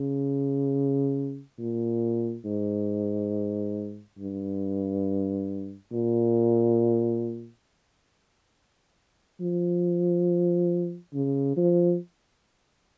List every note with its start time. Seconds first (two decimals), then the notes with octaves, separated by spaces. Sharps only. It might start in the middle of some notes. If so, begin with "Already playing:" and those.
Already playing: C#3
1.58 A#2
2.45 G#2
4.18 G2
5.92 A#2
9.40 F3
11.14 C#3
11.57 F3